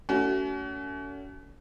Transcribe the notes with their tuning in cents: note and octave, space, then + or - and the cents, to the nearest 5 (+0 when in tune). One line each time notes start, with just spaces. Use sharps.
A3 +30 C#4 +40 F#4 +35